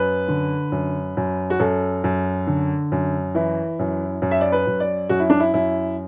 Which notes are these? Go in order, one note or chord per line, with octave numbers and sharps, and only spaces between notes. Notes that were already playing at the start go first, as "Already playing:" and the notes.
Already playing: F#2 B4
D3
F#2
F#2
F#4
F#2 A4
F#2
D3
F#2
E3 E4
F#2
F#2
E5
D5
B4
F#2
D5
F#2 F#4
E4
D4
E4
F#2 E4